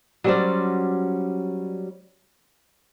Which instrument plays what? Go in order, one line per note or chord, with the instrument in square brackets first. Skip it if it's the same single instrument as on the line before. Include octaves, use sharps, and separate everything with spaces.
[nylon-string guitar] F#3 G3 C#4 F#4 C5 D5